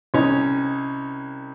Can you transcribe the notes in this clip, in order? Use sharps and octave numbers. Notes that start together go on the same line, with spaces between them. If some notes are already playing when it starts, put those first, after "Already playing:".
C2 C#4 D#4